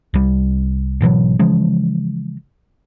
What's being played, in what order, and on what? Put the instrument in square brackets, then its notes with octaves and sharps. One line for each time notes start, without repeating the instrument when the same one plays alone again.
[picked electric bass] C2 G3
G#1 B2 E3 F#3
C#3 E3 F3 G#3